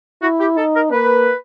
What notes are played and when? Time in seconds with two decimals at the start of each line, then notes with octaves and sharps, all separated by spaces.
0.22 E4 F#4
0.40 G4
0.57 D#4 A4
0.75 A#4
0.92 A#3 B4